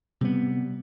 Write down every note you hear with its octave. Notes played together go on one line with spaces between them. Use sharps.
C3 G3 B3